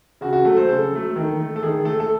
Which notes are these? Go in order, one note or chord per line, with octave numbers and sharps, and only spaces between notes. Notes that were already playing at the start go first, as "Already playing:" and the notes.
C#3 F#4
F#4
F#3 A3 A4
C5
C#3 A4
F#3 A3
D#3
A3
A4
D#3 G#4
A3 A4
A4